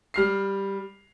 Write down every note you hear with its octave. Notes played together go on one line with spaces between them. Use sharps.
G3 F6 C7